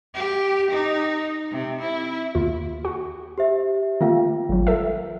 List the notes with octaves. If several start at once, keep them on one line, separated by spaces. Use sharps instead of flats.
G4
D#4
C3
E4
D#2 F4
F#4
G4 C5 E5
D#3 A3 A#3 F4 F5 G5
G#1 F#3
A4 A#4 E5